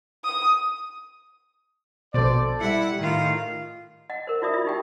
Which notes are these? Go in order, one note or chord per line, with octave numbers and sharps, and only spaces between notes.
D#6
A#1 B2 A4 C5 D5
G3 E4 F#5
A2 D#3 F4
D#5 F#5
A#4 C5
E4 F#4 D5 E5 D#6
F4 D5 E5
D#4 G4 G5